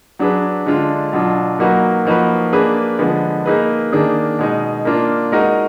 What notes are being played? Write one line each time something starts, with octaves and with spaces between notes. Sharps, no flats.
F#3 D4 G#4 B4
D3 G#3 D4 F4
B2 F#3 D4 F4
F#3 A#3 D#4 F#4 B4
F3 A#3 D#4 F#4 B4
A#3 D4 G#4 B4
D3 F3 G#3 B3
A#3 D#4 G#4 B4
D#3 A#3 D4 G#4
B2 G#3 D#4
A#3 D4 F4
G#3 D#4 F#4 A#4